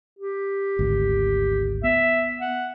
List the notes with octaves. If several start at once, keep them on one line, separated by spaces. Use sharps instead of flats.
G4
G#1 D2
B3 E5
F#5